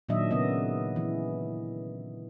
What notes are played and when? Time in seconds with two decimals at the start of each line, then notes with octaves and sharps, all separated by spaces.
0.09 A#2 D#3 F#3 D4 D#5 E5
0.31 C#3 B3 D#5
0.96 E3